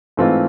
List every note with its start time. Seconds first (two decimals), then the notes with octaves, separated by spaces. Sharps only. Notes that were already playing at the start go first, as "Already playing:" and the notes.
0.17 G#2 E3 A3 C4 F4